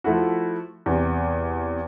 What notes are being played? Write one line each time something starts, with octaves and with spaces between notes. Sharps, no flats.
F3 A3 E4 F#4
E2 C3